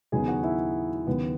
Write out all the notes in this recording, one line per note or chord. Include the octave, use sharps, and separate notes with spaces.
D#2 C#3 F#3 B3 D#4 G#4 G#5
F#4 F#5
E4 E5
D#2 C#3 F#3 B3 B4